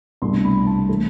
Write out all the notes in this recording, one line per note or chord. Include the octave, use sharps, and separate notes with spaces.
C2 B2 A3 D4 C6
B5
A5
E3 A3 C4